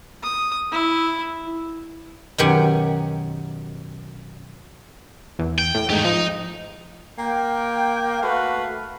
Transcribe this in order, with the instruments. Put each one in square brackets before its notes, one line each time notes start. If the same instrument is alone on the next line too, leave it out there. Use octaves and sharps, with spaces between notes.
[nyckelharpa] D#6
E4
[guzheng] F#2 B2 D#3 G4 F#5 G#5
[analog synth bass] E2
[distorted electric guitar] G5
[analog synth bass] A2
[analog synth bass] G#2 [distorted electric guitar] D#4 G4
[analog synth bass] F3 [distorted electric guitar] D#4
[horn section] A#3 G5
A3 F#4 B4 F5